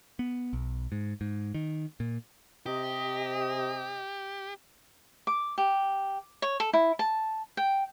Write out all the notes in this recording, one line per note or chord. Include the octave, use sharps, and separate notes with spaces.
B3
B1
G#2
G#2
D#3
A#2
C3 G4 D#5
D6
G4
C#5
A4
E4
A5
G5